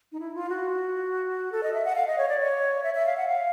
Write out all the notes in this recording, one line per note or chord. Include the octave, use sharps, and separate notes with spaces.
D#4
E4
F4
F#4
A4
D#5
E5
F#5
F5
D#5
C#5
D5
C#5
E5
E5
F5
F#5
F5